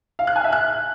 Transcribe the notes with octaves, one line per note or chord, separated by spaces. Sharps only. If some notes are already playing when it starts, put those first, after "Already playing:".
F5
F#6
G#5
E5
F#6